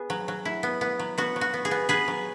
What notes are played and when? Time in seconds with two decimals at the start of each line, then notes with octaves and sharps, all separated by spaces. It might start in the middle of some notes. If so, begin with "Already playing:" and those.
Already playing: B3 G#4
0.10 F#3
0.28 F#3
0.45 E4
0.63 B3
0.81 B3
0.99 F#3
1.18 B3 F#4
1.36 F#3
1.41 F#4
1.54 B3
1.65 G#4
1.71 B3
1.89 B3 G#4 B4
2.08 F#3